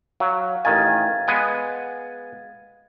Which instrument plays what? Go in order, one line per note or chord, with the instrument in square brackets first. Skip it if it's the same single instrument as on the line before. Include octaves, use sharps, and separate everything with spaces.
[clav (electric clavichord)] F#3 [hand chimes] F5
[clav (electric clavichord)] A1 D#3 G#5 [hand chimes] F5 G#6 A6
[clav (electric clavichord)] G#3 B3 G#5